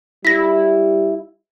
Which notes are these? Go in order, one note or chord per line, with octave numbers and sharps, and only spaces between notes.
G3 E4 A#6 B6